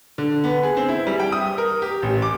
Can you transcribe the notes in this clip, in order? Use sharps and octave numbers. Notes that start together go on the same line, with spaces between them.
D3
B3
G#4
C4
E4
G3
G5
D#6
A#4
G4
A1
D6